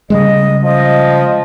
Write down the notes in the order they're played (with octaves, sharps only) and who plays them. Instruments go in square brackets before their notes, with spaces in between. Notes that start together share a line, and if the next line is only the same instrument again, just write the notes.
[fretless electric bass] C#3 G3 G#3 [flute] D#5
[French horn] F3 [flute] D#5